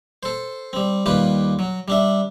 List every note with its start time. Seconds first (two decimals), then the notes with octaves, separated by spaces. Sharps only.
0.23 A4 C5
0.73 G3 C4
1.06 D#2 G3 F4 G4 B4
1.59 F#3
1.88 G3 D4 E5